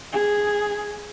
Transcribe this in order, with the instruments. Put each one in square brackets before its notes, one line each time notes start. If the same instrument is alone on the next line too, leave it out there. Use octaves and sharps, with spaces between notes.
[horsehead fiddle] G#4